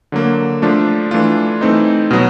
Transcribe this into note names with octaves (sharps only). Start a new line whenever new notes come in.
D3 F#3 A#3
F3 A3 D4 F4
E3 A3 D4 F4
E3 A3 C4 D#4
B2 F#3 B3